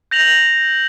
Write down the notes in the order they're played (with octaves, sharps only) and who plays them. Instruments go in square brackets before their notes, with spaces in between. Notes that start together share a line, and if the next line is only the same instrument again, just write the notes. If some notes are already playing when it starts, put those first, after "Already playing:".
[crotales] G6 A#6 F7 F#7